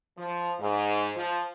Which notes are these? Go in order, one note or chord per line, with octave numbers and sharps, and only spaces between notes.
F3
G#2
F3